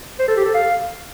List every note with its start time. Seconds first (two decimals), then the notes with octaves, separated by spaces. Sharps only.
0.19 C5
0.28 A4
0.37 G4
0.45 A4
0.54 F5